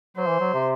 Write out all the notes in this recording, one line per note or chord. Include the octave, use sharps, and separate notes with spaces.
F#3 C5
E3
F#3
C3